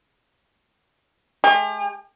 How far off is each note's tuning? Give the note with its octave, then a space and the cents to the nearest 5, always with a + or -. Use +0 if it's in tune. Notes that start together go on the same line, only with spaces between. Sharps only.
G#3 +45 G4 +45